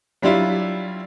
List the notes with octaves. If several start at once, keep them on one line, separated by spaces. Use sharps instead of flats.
F#3 G3 D4 E4 F4